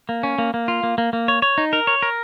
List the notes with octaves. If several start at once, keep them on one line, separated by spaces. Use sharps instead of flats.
A#3
C#4
A#3
A#3
F4
A#3
A#3
A#3
C#5
C#5
D#4
A#4
C#5
A#4